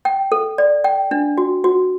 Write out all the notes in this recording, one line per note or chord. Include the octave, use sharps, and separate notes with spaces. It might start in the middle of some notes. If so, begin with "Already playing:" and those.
G5
A4
D5
G5
D4
F#4
F#4